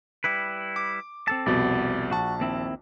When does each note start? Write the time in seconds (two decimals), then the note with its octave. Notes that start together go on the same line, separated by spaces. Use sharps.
0.24 G3 E4 B4
0.76 D6
1.28 C4 A4 A5
1.46 C2 F2 B2 D5
2.11 A#1 F#4 A5
2.40 D#2 C4 E4